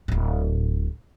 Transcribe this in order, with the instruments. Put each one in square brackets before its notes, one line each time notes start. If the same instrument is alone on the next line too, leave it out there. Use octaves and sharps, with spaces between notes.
[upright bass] D1 A2